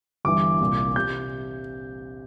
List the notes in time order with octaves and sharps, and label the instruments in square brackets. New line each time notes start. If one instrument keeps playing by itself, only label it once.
[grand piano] G1 G2 E3 D6
C2 A#2
C3 G6